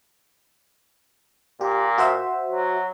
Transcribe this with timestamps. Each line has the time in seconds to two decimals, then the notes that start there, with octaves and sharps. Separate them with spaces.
1.61 A#2 G4
1.98 F#4 C5 E5
2.51 F#3